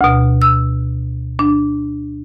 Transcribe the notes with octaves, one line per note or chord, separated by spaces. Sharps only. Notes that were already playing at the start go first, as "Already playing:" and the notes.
D2 B2
E6
D4